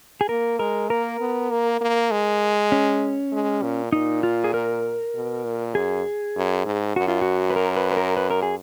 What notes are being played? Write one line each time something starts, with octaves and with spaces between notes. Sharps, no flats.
G#4
A#3 A#4
G#3 A#4
A#3 A#4
B3
A#3
A#3
G#3
C#4
G#3
A#2
A#2 D#4
F4
G#4
A#4
B2
A#2
F#2 G#4
F#2
G#2
F#2 F#4
F4
F#4
B4
A#4
B4
B4
A#4
B4
A#4
G#4